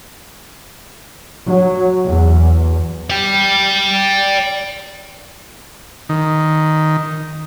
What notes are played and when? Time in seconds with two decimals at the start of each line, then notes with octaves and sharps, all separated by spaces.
1.47 F#3
2.08 E2
3.10 D5 G5
6.09 D#3